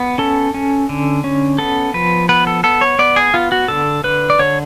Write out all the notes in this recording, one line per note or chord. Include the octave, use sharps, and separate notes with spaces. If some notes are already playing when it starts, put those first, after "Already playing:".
Already playing: B3
C#4 A4
C#4
D3
C#4
B3 A4
F3 B4
B3 B4
A4
B3 A4
C#5
B3 D5
G#4
B3 F4
F#4
D3 A4
D3 B4
D5
D3 C#5